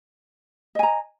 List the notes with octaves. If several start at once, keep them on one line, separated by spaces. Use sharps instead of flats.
D#5 G#5 A#5